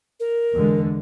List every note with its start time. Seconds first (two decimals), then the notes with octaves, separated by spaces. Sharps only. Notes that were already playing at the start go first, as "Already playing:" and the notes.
0.20 A#4
0.54 E2 D3 G#3